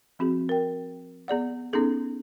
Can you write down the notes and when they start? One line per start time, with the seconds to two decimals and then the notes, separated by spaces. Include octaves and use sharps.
0.19 F3 C4 F#4 G#4
0.49 A#4 G5
1.28 B3 G#4 D5 F#5
1.73 B3 C#4 D#4 G#4 A4